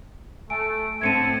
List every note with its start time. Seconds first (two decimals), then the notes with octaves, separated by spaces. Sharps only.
0.50 A3 G#5 D7
1.01 A2 D3 C4 E5 A5 G#6 C#7 D#7